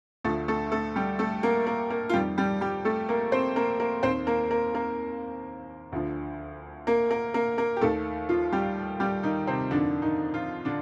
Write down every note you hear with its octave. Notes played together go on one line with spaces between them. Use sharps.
D2 D3 F3 A3 A4
A3 A4
A3 A4
G3 G4
A3 A4
A#3 A#4
A#3 A#4
A#3 A#4
F4
F2 D#3 G3 G4
G3 G4
G3 G4
A3 A4
A#3 A#4
C4 C5
A#3 A#4
A#3 A#4
D#2 D#3 C4 C5
A#3 A#4
A#3 A#4
A#3 A#4
D2 D3 F3
A#3 A#4
A#3 A#4
A#3 A#4
A#3 A#4
G4
D#2 D#3 A3 A4
F3 F4
G3 G4
G3 G4
D#3 D#4
C3 C4
F2 D3 D#3 D4
D#3 D#4
F3 F4
D3 D4